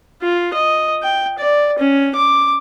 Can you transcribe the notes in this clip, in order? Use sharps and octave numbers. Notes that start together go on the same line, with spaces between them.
F4
D#5
G5
D5
C#4
D6